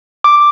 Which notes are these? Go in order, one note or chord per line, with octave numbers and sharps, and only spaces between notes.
D6